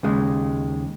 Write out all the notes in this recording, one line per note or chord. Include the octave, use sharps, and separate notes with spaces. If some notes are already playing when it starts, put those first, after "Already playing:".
D#2 C#3 G#3